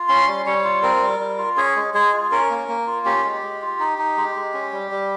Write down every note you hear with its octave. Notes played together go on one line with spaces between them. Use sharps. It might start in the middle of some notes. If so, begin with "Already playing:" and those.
Already playing: F4
C#4 C6
G3
G3 C#5
F4
C4 A#4
G3
G3
F4
C#4 G#4
G#3
G#3 G#4
F4
C#4 A#4
A#3
A#3
F4
C#4 G4
G#3
G#3
F4
D#4
D#4
G#3
G#3
C#4
G3
G3